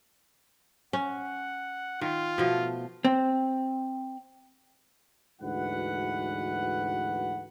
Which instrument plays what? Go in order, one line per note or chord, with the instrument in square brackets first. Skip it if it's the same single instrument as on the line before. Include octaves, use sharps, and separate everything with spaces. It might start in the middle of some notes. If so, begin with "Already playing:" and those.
[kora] C#4 [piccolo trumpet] F#5
[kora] D#3 [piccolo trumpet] F4
[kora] B2 F3 A3
[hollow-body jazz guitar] C4
[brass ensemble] D2 G#2 E3 F#4 B4 F#5